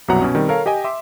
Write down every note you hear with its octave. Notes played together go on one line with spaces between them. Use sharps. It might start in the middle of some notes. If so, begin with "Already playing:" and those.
C2 F#2 B2 F#3 F#5 A#5
B2 C#4
D#3 G3 C4
A4 A#4 C#5 F5
G4 D#5 G5 G#5
E5 C6 D6